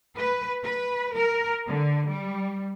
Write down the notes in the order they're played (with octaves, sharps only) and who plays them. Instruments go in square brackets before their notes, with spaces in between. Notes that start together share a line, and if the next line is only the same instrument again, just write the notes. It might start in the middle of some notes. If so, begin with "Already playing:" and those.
[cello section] B4
B4
A#4
D3
G3